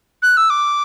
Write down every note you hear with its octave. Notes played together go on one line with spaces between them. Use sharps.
F#6
E6
D6